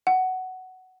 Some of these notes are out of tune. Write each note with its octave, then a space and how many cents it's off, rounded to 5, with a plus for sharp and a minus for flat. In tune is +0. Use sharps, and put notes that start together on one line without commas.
F#5 +10